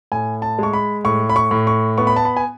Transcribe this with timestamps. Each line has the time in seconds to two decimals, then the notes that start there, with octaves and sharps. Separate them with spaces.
0.12 A2 G#5
0.42 A5
0.58 G#3 C#6
0.73 B5
1.05 A2 C#6
1.29 B5
1.36 C#6
1.51 A2
1.67 C#6
1.98 B3 C#6
2.07 B5
2.16 A5
2.25 B5
2.37 G#5